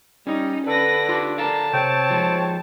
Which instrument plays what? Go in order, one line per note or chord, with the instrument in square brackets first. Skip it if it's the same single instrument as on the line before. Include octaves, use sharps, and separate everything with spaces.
[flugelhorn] G3 [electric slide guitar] C#4 [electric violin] D#4
[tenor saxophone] D3 [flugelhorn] A4 [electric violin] B4 A#6
[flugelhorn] D4 [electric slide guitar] F4 G4
[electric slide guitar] A4 D5 F5 [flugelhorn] A#4 [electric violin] A5
[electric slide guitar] C3 [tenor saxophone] C4 [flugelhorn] C#5
[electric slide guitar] F3 G#3